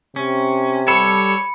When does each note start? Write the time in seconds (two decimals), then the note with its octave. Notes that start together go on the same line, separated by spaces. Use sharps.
0.16 C3 C#4
0.88 G3 A4 C#5 B5 C#7